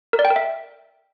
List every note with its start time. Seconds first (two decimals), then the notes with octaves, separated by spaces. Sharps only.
0.13 A#4
0.19 D5
0.25 G5
0.30 A#4
0.36 E5